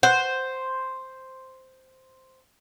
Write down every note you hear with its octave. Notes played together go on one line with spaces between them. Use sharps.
C5 F#5